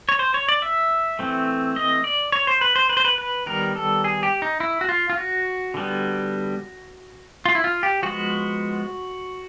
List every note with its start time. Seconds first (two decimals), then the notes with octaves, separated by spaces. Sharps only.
0.09 C#5
0.19 C5
0.34 C#5
0.48 D5
0.62 E5
1.19 E3 A3 C4
1.76 D#5
2.04 D5
2.32 C#5
2.47 C5
2.61 B4
2.76 C5
2.89 B4
2.97 C5
3.05 B4
3.18 B4
3.46 D#3 G3 B3 A#4
3.76 A4
4.04 G#4
4.23 G4
4.42 D#4
4.60 E4
4.81 F#4
4.89 F4
5.10 F4
5.17 F#4
5.74 D3 G3 B3
7.46 F4
7.55 E4
7.64 F4
7.83 G4
8.02 F3 G#3 B3 F#4